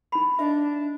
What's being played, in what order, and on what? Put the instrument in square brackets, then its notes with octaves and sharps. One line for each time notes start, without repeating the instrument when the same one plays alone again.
[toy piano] D#4 B5
[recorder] D4 [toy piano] D#5 E5